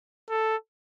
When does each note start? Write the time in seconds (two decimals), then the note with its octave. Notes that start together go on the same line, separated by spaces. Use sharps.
0.30 A4